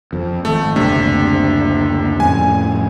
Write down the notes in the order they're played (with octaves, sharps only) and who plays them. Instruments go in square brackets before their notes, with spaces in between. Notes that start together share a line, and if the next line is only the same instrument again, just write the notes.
[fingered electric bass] F2
[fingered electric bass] G#1 [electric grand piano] A3
[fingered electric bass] F#1 D2 D4 [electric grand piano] C3
[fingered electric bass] F2 A2 C#4 [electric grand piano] G#5